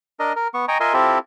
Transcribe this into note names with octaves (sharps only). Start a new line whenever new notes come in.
D4 A#4 D#5
A#4
B3 C#6
D#5 G5 G#5 A#5 C#6
F4 A#4 D#5 E5 G#5 C6
C4 E4 F4 G4 A4 E5